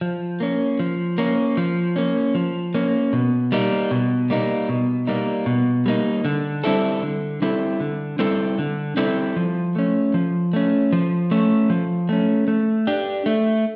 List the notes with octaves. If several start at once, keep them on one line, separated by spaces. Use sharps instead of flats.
F3
A#3 C#4
F3
A#3 C#4
F3
A#3 C#4
F3
A#3 C#4
B2
G3 A#3 D#4
B2
G3 A#3 D#4
B2
G3 A#3 D#4
B2
G3 A#3 D#4
D3
G3 C4 E4 A4
D3
G3 C4 E4 A4
D3
G3 C4 E4 A4
D3
G3 C4 E4 A4
F3
A3 C#4
F3
A3 C#4
F3
A3 C#4
F3
A3 C#4
A3
D4 G4
A3